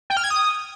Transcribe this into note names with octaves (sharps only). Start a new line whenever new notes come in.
G5
F6
G#6
D#6